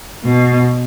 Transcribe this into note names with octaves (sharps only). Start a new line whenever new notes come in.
B2